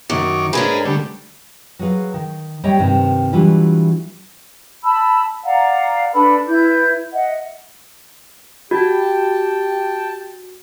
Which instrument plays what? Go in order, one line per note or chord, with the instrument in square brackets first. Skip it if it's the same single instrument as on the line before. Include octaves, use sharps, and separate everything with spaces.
[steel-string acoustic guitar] F#2 [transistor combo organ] D#3 C#6 D6
[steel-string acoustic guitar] G#2 C#4 D4 [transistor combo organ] G#4 A#4 B4
[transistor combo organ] D3 G3 A3
[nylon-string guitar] F#3 G#4 B4 F5
D#3
G3 G4 C#5 D#5 E5 G5
G2 C3 D#3 G3 C4
E3 F#3 G3 A3 D4 F4
[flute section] A5 B5 E6
D5 F5 F#5 A#5
D4 A4 B4 B5
E4 B4 G6
D#5 E5 F#5
[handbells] F#4 [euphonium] G4 [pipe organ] G5 A5